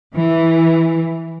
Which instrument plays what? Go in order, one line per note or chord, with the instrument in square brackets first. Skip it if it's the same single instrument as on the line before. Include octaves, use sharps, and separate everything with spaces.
[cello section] E3